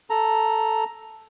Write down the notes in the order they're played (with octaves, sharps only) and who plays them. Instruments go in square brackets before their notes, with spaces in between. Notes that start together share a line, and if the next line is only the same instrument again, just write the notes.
[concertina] A4 A#5